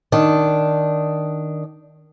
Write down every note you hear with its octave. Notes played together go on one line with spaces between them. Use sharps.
D#3 D4